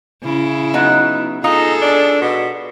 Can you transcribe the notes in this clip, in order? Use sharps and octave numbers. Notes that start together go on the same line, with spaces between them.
C#3 E4
F#3 B3 D#4
D#4 F4 G#4 A4
D4
B2